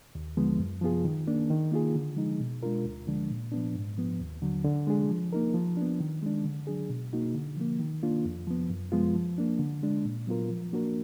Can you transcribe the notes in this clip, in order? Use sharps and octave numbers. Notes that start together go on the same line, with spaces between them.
D#2
D3 F3 G#3 B3
F#2
F3 B3 F4 G#4
D#3
A#3 D4
D#3
A#3 F4 G#4
D3
F3 G#3 D#4
B2
G#3 D4 F4 A#4
D2
D3 F3 G#3 D4
A#2
F3 B3 D4
G#2
F3 B3
D#2
D3 F#3
D3
G#3 D4 G#4
F3
A#3 D#4 A#4
F3
D4
B3
D#3
G#3 D4
D3
F#3 D4 G#4
B2
A#3 D#4 F#4
D3
F3 A#3
D#3
A#3 D4 F4
F2
F3 B3
F#2
F3 G#3 B3 F4
F3
A#3 D4
D3
G#3 D4
A#2
F#3 B3 F4 A#4
F3
A#3 D4 F#4 A#4